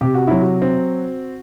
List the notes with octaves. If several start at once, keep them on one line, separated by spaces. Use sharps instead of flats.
C3 G4
F#4
F#3 E4
F#4
C4